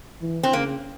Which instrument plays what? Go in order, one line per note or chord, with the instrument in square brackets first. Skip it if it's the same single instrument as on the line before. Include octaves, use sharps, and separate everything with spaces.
[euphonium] E3
[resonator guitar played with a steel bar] C4
[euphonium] C#3 [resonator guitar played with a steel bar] A#3